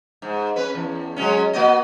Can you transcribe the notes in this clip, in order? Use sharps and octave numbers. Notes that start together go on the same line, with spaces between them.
G#2
C#4 B4
E2
F#3 G#3 C#4
A#3 F#4 D#5